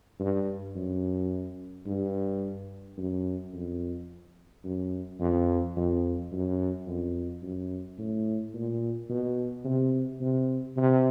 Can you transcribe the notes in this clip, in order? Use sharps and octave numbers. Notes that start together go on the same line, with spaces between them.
G2
F#2
G2
F#2
F2
F#2
F2
F2
F#2
F2
F#2
A2
A#2
B2
C3
C3
C3